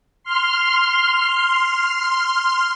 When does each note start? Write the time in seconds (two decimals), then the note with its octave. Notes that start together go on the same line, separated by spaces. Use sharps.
0.23 C6 F6